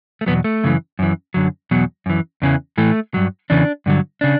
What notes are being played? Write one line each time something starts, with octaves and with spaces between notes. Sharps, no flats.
A3
E2 B2 F#3 B3
A3
F#2 C#3 E3
F#2 E3
F#2 D3 F#3
E2 B2 F#3
F#2 E3
E2 C#3 E3
A2 E3 A3
G2 F#3
E2 C#3 E3 D4
G2 D3 F#3
C#3 D4